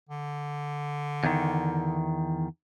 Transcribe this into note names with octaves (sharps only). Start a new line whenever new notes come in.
D3
E2 D#3